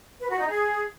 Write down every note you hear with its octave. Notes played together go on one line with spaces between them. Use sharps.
B4
F#4
D#4
G#4